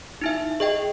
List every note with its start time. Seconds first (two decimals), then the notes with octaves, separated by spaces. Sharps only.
0.21 D#4 E4 E5
0.60 G#4 D#5 G5